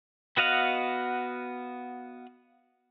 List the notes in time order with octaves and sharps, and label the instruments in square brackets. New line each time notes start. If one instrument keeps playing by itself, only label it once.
[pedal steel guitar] B3 F#4 D#5 F5 F#5